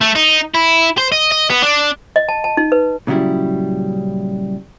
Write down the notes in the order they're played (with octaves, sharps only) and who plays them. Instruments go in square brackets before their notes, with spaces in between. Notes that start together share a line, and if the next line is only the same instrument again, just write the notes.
[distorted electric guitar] A3
D#4
E4
C5
D#5
D#5
B3
D4
[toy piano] D#5
A5
A5
D#4
B4
[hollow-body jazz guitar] A#2 C#3 F#3 G3 E4